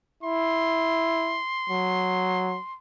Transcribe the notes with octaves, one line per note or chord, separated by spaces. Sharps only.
E4 C6
F#3